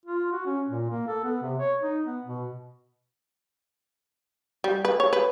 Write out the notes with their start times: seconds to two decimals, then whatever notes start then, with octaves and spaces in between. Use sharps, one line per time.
0.06 F4
0.32 F#4
0.46 C#4
0.68 A#2
0.90 A#3
1.08 A4
1.24 B3
1.42 C3
1.58 C#5
1.81 D#4
2.06 B3
2.25 B2
4.64 G3
4.85 B4
5.00 C#5
5.13 B4